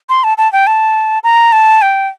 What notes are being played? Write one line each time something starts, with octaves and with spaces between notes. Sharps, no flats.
C6
A5
A5
G5
A5
A#5
A5
G5